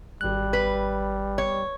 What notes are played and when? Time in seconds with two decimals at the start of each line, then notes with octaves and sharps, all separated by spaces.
0.21 G#1 G3 F#6
0.53 B4
1.38 C#5